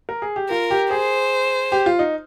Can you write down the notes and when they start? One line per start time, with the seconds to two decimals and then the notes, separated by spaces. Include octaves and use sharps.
0.09 A#4
0.22 G#4
0.36 G4
0.50 F4 A#4
0.71 G4
0.91 G#4 C5
1.72 G4
1.86 F4
1.99 D#4